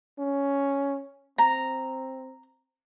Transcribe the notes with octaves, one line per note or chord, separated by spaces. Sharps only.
C#4
C4 A#5